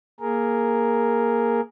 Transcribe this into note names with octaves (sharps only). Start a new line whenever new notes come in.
A#3 G#4 A#4